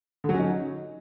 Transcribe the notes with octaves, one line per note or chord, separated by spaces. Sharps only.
D3
F#3
C#4
D#4